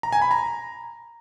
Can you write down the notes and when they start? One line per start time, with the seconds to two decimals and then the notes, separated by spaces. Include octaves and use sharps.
0.03 A#5
0.13 G#5
0.22 B5
0.31 A#5